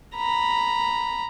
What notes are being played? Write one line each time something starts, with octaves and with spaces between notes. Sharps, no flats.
A#5 B5